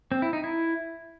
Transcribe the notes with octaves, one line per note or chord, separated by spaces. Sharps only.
C4
E4
D#4
E4